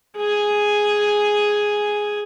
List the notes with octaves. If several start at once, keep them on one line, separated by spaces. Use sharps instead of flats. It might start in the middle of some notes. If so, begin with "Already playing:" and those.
G#4 G#5